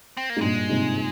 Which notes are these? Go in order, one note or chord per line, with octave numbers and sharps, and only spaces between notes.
C4
A#3
G#2
G2 A#2 G#3
G#2 C3